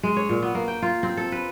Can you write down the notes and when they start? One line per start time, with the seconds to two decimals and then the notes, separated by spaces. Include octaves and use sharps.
0.03 G#3
0.17 C#5
0.29 A#2
0.42 B3
0.55 A#3
0.68 G5
0.82 F4
1.03 C4
1.17 A4
1.32 B4